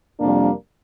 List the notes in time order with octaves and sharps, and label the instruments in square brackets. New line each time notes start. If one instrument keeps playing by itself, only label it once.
[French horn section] F2 C3 G3 A#3 D4